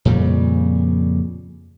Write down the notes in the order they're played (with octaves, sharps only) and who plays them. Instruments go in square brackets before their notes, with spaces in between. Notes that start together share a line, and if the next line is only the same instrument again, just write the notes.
[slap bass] F2 A#2 C#3 G3